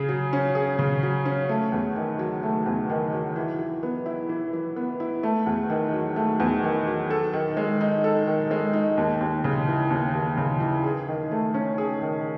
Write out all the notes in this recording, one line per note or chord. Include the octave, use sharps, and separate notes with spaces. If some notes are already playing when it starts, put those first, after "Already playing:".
Already playing: C#3 G#4
F#3
C#4
G#4
C#3
F#3
C#4
A3
E2
D#3
F#3
A3
E2
D#3
F#3
E3
E3
B3
E4
E3
E3
B3
E4
A3
E2
D#3
F#3
A3
E2
D#3
F#3
A4
D#3
G#3
D#4
A4
D#3
G#3
D#4
D#2
D#2
C#3
E3
D#2
D#2
C#3
E3
G#4
D#3
A3
C#4
G#4
D#3